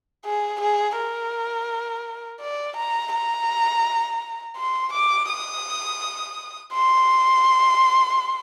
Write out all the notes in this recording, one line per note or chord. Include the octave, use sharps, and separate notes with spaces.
G#4
G#4
A#4
D5
A#5
A#5
C6
D6
D#6
C6